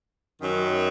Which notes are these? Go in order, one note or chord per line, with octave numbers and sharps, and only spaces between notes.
F#2 D#3 F#3